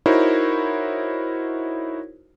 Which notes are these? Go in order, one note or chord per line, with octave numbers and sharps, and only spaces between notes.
D#4 E4 F#4 A#4 C5 C#5